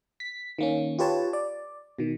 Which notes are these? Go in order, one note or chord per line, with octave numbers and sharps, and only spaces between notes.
B6
D#3 A#3 C#4
F4 G4 B4 C#5 A5
D5
B2 D#3